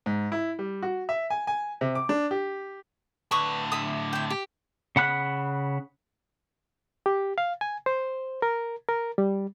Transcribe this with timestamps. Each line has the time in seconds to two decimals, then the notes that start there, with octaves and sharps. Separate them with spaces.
0.06 G#2
0.32 E4
0.59 G3
0.82 F#4
1.09 E5
1.30 G#5
1.47 G#5
1.81 C3
1.95 D6
2.09 D4
2.31 G4
3.31 A2 D3 B4 C#6 D#6
3.72 E5 D#6
4.13 E4 G5
4.30 G4
4.96 C#3 F#5 B5 F#6
7.06 G4
7.38 F5
7.61 G#5
7.86 C5
8.42 A#4
8.89 A#4
9.18 G3